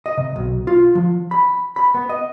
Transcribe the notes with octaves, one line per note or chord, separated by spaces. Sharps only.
D#5
C3
B1
F4
F3
B5
B5
B3
D#5